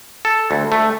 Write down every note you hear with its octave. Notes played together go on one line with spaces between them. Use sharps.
A4
D2
A3